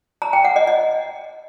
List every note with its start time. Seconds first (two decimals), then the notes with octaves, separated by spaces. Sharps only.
0.22 A#5
0.33 G5
0.45 F#5
0.56 D#5
0.67 D#5